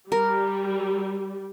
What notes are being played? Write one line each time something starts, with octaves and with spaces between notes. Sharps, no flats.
G3 A#4